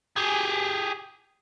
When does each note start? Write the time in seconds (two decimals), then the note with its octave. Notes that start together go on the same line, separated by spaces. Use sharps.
0.16 G4 G#4